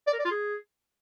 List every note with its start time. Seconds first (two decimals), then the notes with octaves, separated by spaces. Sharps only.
0.07 D5
0.13 A#4
0.19 D5
0.25 F4
0.31 G#4